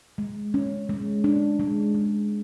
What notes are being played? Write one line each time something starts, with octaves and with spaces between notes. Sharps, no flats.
G#3
C#4
G#3
D4
G#3
G#3